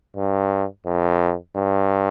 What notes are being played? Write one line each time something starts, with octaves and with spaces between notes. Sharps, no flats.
G2
F2
G2